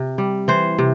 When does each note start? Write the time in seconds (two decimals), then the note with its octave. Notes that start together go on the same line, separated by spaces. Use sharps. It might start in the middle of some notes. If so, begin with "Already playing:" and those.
Already playing: C3
0.18 G3
0.48 E3 C5
0.79 C3